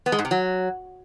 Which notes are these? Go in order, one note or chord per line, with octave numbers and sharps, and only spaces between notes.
B3
G#3
G#2
C3
F#3